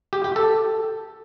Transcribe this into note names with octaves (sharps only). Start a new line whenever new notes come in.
G4
G4
A4